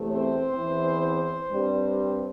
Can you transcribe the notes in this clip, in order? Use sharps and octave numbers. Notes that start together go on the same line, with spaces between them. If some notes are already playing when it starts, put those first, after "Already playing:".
Already playing: E2 C3 A3
C4 C5
E2 E3 C4
G2 G3 C4